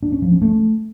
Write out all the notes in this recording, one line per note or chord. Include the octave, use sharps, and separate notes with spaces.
D4
C#4
F3
C#4
A3